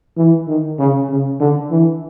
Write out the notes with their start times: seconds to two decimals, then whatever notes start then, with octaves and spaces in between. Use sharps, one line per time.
0.17 E3
0.48 D#3
0.78 C#3
1.09 C#3
1.40 D3
1.71 E3